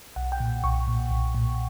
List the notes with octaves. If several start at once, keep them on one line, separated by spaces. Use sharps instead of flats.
B1 F#5
G5
A#2
B1 C#6
A#2
B1
A#2